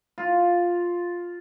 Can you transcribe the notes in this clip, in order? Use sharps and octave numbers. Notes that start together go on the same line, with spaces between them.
F4